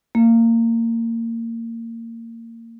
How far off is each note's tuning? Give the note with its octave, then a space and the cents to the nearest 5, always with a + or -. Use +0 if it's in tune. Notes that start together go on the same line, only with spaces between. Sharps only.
A#3 -25